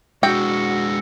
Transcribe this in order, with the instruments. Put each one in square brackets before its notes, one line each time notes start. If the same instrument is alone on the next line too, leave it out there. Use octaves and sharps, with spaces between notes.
[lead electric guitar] G#3 D4 [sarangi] F#4 [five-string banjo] G5 [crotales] E6 A#6 C#7